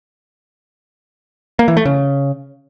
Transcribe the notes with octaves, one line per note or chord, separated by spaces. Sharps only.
A#3
E3
A3
C#3